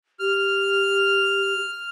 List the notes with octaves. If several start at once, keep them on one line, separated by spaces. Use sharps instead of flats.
G4 F6